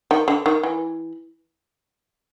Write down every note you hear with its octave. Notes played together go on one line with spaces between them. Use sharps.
D#3
D3
D#3
E3